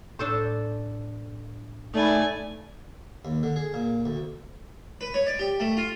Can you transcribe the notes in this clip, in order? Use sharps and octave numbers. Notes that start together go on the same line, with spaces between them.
A2 D4 A4 C5 E6
A3 D#4 D5 G#5 B5
D#2
D3
G#4
A#2
D2
B4
C#5
D5
G4
A3
F4